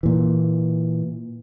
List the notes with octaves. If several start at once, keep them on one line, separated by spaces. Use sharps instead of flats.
A#2 E3